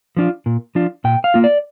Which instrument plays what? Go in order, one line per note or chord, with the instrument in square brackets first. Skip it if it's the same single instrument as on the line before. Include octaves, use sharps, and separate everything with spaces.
[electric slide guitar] F3 D4 F4
A#2
F3 D4 F4
A#2 G5
F5
A#3 F4
D5